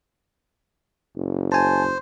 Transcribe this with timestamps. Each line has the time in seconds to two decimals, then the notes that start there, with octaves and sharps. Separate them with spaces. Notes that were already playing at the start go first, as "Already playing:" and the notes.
1.16 F#1
1.52 C5 G#5 A5